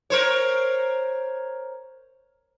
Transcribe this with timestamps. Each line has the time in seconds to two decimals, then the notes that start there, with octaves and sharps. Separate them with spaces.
0.10 A#4 C5 C#5